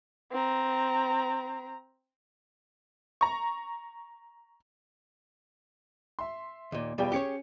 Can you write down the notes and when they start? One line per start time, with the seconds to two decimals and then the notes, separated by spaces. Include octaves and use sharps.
0.32 C4 A#5
3.21 A#5 C#6
6.19 E5 C6
6.72 D#2 A#2
6.98 E2 B2 G3 F4 G4 G5
7.12 C#4 G4 G#4 C#5 C#7